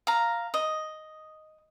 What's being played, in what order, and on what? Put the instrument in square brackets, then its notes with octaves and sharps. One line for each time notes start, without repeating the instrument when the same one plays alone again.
[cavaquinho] F5 A#5
D#5